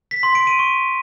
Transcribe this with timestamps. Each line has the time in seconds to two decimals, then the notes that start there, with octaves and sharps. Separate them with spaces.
0.11 B6
0.23 C6
0.35 D7
0.47 D#7
0.59 C#6